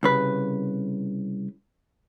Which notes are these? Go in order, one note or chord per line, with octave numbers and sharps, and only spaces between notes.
C2 C#3 B4